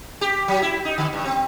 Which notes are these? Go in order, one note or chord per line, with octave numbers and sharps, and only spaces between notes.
G4
F#3
E4
D#4
D3
G2
C4